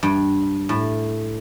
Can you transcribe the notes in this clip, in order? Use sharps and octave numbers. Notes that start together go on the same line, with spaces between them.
G2
A2